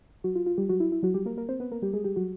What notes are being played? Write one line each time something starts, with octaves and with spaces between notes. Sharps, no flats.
F#3 F#4
F4
F4
G3 G4
F#3 F#4
E4
E4
F#3 F#4
G3 G4
A#3 A#4
A#3 A#4
C4 C5
B3 B4
A#3 A#4
G3 G4
G#3 G#4
G3 G4
F#3 F#4